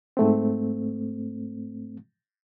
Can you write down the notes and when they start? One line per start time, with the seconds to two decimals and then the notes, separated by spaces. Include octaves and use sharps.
0.17 G#2 A3 C4